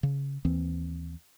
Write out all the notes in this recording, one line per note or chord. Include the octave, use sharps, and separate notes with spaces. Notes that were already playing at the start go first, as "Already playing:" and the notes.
C#3
D#2 E3 C4